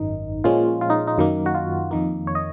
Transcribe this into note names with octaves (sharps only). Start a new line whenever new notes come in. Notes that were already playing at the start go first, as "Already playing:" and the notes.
Already playing: G#1 F#2 D#3 D#4
A#2 F3 G#3 C#4 F4
F4
D#4
D#4
F#2 D#3 A#3
F#4
F4
F2 D#3 A#3
C#5
D#5